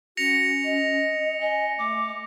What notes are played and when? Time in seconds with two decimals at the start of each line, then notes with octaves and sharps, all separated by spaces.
0.17 C#4 F#4 A#6 C#7 F7
0.65 D#5
1.41 D#5 G#5
1.78 A3 D6